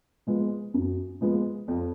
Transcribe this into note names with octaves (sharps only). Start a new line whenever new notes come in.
F3 G#3 B3
F#2
F3 G#3 B3
F2